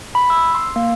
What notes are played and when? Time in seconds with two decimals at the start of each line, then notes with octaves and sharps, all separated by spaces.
0.15 B5
0.30 E6
0.55 C6
0.76 A#3